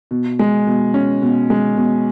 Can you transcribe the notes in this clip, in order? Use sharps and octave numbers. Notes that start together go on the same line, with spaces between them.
B2
G#3
B2
C#4
B2
G#3
B2